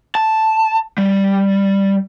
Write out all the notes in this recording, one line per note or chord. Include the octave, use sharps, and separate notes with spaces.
A5
G3